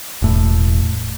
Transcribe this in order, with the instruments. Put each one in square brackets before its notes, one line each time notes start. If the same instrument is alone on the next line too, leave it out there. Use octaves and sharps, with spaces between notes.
[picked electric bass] E1 A2